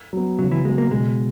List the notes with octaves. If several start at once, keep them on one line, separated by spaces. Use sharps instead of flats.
F#3 B3
C#3 F#3
E3
F#3 G#3 B3
A#3
B2 G#3